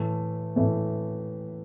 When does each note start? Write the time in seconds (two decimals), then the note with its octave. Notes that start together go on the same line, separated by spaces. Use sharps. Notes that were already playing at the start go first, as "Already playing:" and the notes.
Already playing: A2 E3 A3
0.56 A2 E3 A3